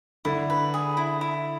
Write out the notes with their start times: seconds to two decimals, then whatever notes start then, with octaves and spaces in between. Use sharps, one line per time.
0.25 D3 E4
0.50 B4
0.74 G#4
0.97 E4
1.21 E4